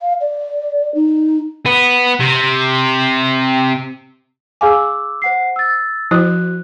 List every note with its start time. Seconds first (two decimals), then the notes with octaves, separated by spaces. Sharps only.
0.01 F5
0.21 D5
0.95 D#4
1.66 B3
2.20 C3
4.61 G#4 F5 G#5 D6 E6
5.22 C5 F#5 C7
5.56 E6 A6
6.11 F3 E4 F#4 C5 F#6